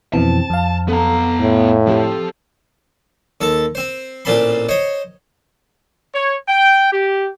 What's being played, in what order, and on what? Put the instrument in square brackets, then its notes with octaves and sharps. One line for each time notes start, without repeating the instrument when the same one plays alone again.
[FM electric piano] F2 B2 E3 [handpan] C4 [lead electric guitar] A5
[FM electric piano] F2 F5
[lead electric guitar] B3 A#5 [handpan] A4
[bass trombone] A2
[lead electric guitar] F3 [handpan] C4 G4 A4
[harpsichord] D#2 A4 A5
C4 C5
A1 A#2 C4 A5 B5 C6
C5 C#5 D#5
[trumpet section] C#5
G5
G4